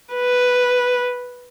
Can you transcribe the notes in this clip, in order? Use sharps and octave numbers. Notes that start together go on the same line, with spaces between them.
B4